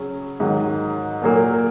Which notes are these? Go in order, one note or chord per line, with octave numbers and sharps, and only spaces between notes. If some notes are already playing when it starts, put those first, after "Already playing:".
Already playing: C#3 F#3 C#4 G#4
G#2 D#3 F#3
A#2 F#3 A#3